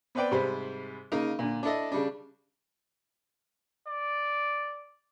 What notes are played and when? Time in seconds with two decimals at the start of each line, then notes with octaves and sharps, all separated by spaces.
0.15 B3 C4 B4 D5 G5
0.31 G#2 C3 G3 C5 B5
1.12 C#3 A#3 D#4 A#4
1.39 A#2 D3
1.63 D4 E4 A4 D#5
1.92 C#3 G3 D4
3.88 D5